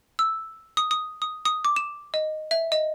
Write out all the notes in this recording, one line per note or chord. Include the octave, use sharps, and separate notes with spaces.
E6
D#6
D#6
D#6
D#6
D6
E7
D#5
E5
D#5